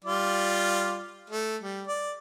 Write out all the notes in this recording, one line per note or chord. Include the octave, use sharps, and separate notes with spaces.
G3 F4 D5
A3
G3
D5